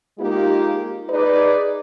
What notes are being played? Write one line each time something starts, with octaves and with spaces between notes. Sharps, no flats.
G#3 A#3 D#4 F4 G4
D#4 G#4 B4 D5